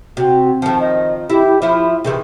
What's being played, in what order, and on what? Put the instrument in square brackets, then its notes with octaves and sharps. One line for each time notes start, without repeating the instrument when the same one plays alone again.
[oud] C3 [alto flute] F#4
[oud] D#3 F3 [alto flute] A5
[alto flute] D#5
[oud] E4 [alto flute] G4
[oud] F3 E4 [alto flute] E5
[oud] C3 D#3 E3 [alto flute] G#4